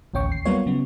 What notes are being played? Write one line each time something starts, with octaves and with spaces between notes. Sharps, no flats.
A1 D2 C#4 G5 C#6
D#2 C7
F#3 G3 A#3 B3 F4 C#5
C#3 F#3 B3